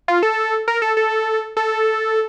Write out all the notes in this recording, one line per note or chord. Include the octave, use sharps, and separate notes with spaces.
F4
A4
A#4
A4
A4
A4